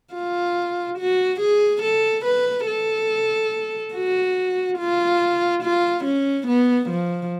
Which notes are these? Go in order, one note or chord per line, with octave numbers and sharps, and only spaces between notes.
F4
F#4
G#4
A4
B4
A4
F#4
F4
F4
C#4
B3
F3